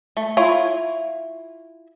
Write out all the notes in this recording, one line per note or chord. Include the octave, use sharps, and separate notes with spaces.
A3
E4 F4 C#5